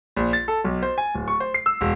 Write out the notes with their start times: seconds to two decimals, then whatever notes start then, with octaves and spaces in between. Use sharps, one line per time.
0.16 A#1
0.33 A6
0.48 A4
0.64 B1
0.83 C5
0.98 G#5
1.14 D1
1.28 C#6
1.40 C5
1.54 C7
1.66 E6
1.81 E1